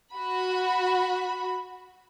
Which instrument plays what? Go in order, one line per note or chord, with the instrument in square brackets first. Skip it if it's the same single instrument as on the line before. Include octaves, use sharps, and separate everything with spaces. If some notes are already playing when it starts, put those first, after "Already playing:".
[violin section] F#4 B5